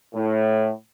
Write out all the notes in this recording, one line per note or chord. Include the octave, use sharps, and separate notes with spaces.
A2